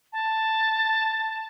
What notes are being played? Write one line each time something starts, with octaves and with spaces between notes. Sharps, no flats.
A5